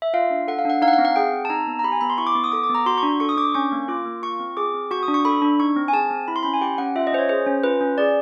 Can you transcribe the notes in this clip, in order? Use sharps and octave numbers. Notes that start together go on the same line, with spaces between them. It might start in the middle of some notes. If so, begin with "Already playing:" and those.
E5
F4 F5
D4
A4 F#5
F5
D4 F#5
D#4 F5
F#5
F5
C4
F#5
G#4 G5
C4
A5
D#4 A#5
B3
A#5
G4 B5
G#5
B3 B5
C6
E4 C#6
D6
B3
D#6
A4 D6
D6
B3 A#5
F#4 C6
C#6
D4
A4 C#6
D#6
D4 D6
C#4 C#6
A#3
F4 D6
A#3
F4 C#6
C4
G#4 D6
C4
F#4 C#6
D#6
D4
C#6
A4 B5
D4
D#4 C#6
C4
G#5
G#4 A5
C4
E4 B5
C6
C#4 B5
G#5
G4 G5
C#4 F#5
F4 E5
D#5
C#4 C5
C#5
G#4 C5
C#4
F4 B4
C#4
G#4 D5